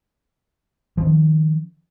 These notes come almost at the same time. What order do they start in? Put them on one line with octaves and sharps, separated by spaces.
F3 C#4 D#3